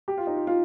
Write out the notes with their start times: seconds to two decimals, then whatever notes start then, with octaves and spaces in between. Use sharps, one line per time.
0.08 G4
0.17 F4
0.27 D#4
0.37 F4
0.47 F4